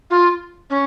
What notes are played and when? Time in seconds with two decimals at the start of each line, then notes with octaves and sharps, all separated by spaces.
0.10 F4
0.70 C#4